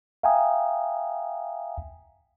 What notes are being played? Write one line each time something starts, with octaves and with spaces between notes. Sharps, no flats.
E5 F5 G5 G#5 A#5 D#6